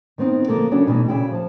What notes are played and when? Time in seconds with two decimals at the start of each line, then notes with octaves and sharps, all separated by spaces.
0.18 D#3 B3 C4 D#4
0.48 D3 F3 G#3 A#3 G#4 A4
0.71 C#3 F#3 C#4 D4 F#4
0.87 B2 E3 G3 A3 D#4 D#5
1.08 A#2 C#3 E4 F#4 G#4 G5
1.31 F3 A5